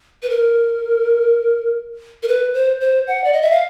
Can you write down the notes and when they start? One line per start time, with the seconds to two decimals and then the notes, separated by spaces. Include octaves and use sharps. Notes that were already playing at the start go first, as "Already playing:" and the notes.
0.23 B4
0.30 A#4
2.23 A#4
2.28 B4
2.54 C5
2.81 C5
3.07 F#5
3.24 D5
3.33 D#5
3.42 E5
3.51 F5